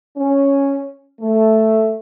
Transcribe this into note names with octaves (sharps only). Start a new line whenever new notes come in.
C#4
A3